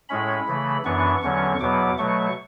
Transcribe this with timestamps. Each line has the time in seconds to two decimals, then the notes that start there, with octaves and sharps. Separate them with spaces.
0.09 A2 G#3 C#4 B5
0.48 C#3 E3 A3
0.85 F#2 E3 B3 D4 C#6
1.22 E2 D3 F#3 C#4 C#6
1.60 E2 B2 F#3 B3 D6
1.98 B2 F#3 A3 C#6